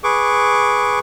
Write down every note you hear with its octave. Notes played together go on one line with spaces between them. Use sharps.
G#4 B4 C#6 D6